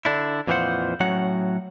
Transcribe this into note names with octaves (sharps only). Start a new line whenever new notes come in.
D3 D4 E4
F2 A#2 E3 F3 C5 F#5
A2 F#3 C#4 F#4 F#5